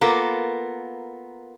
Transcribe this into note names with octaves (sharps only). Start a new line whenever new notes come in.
A#3 B3 F4 A4 A#4